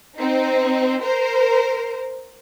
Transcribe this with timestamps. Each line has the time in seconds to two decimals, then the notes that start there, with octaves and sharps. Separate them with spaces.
0.17 C4 D#4
1.01 A#4 C5